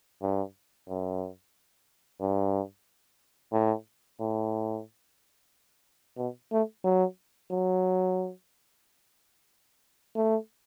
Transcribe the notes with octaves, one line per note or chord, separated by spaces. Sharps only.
G2
F#2
G2
A2
A2
B2
A3
F#3
F#3
A3